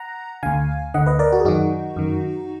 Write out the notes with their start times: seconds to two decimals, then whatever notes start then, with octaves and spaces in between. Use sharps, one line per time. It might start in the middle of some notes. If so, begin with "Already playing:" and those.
Already playing: F#5 A#5
0.43 D2 D3 F5 G#5
0.94 D2 D3 D#5 F#5
1.06 B4 D#5
1.19 A#4 D5
1.32 F#4 A#4
1.40 G#4
1.45 F#2 D#3 D#4 F#4
1.96 F#2 D#3